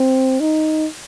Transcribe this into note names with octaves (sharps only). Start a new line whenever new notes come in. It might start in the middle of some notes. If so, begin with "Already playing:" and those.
Already playing: C4
D#4